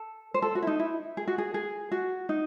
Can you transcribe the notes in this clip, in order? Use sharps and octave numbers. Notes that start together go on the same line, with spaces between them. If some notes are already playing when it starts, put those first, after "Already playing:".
Already playing: A4
C5
A4
F#4
E4
D#4
E4
G#4
F#4
G#4
G#4
F#4
D#4